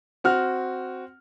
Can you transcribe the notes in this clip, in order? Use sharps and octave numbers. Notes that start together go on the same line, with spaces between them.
C4 F#4 F6